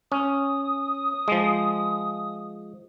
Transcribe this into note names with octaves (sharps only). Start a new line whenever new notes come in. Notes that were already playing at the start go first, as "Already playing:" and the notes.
C#4 D#6
F3 G#3